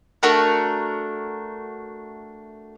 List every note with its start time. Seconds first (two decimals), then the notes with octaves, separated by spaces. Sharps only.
0.23 A3 D4 F#4 A#4